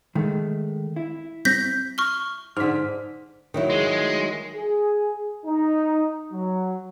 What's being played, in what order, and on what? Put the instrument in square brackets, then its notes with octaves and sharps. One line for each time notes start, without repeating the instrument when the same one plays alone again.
[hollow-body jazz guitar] D#3 G#3 A3
E4
[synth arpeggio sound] G3 C4 [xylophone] G6 A#6 B6
[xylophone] C#6 F6 G7
[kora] G#2 D3 [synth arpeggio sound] F6 B6
[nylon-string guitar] D#3 F#3 E4
[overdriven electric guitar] G#3
[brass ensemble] G#4
D#4
F#3